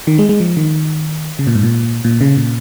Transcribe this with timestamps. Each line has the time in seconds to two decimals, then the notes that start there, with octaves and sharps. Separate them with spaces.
0.07 D#3
0.19 G#3
0.29 G#3
0.40 F3
0.57 D#3
1.39 C#3
1.47 A#2
1.55 G#2
1.63 A#2
2.04 A#2
2.21 C#3
2.37 A#2